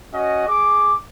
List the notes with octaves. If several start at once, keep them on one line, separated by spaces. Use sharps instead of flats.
C#4 F#4 D#5
G#4 D6